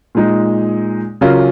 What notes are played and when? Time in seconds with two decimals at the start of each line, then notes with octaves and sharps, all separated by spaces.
0.15 A#2 G#3 D#4
1.21 C#3 F#3 C#4 F4 A#4